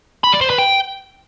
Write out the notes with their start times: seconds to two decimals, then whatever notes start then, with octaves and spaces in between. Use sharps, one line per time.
0.24 B5
0.32 D5
0.41 C5
0.50 B4
0.58 G5